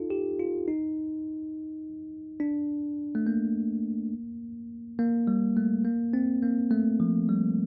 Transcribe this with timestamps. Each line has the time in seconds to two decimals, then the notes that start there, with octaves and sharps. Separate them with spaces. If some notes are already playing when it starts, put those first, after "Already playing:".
Already playing: D#4 F4 A4
0.10 G4
0.39 F4
0.68 D#4
2.40 D4
3.15 A3
3.27 A#3
4.99 A#3
5.27 G3
5.57 A3
5.85 A#3
6.13 C4
6.42 A#3
6.71 A3
7.00 F3
7.29 G3